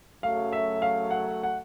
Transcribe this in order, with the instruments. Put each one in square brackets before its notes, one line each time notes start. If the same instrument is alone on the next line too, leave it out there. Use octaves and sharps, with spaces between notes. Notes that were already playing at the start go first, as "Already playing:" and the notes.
[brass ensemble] F#2 C#3 F#3 A3 [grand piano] F5
[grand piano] E5
F5
F#5
F#5